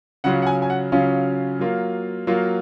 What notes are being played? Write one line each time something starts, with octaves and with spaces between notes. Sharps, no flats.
C#3 F#3 C#4 F4 F#5
F#5
G#5
G#5
F#5
C#3 F#3 C#4 F4 F5
F#3 A#3 F4
F#3 A#3 F4